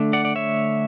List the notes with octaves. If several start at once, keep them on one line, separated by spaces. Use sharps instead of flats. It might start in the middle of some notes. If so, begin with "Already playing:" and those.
Already playing: D3 A3 D4
D5 F#5
D5
C#5 E5